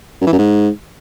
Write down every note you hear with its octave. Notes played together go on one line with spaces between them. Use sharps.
F#2
E3
F#2
G#2